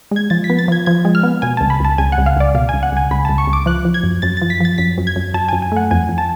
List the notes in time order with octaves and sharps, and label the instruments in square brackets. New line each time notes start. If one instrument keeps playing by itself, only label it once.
[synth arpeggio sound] G#3 G#6
F3 A6
B6
B3
A6
F3 G#6
F3 G#6
G#3
F6
B3
B2 G#5
C#2 A5
B5
C#2 A5
C#2 G#5
F#5
C#2
F5
C#2 D5
B2 F5
C#2 G#5
F#5
C#2 G#5
C#2 B5
C#2 A5
C#6
C#2
D6
F3 F#6
F3
G#6
F#2
F#2 A6
F3 A6
B6
F3 A6
F#2 B6
F#2
G#6
F#2
F#2 A5
F#2 G#5
G#5
A3 F#5
F2 G#5
F2
A5